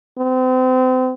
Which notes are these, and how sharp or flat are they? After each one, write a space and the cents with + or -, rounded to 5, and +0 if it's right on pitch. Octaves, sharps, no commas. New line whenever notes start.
C4 -35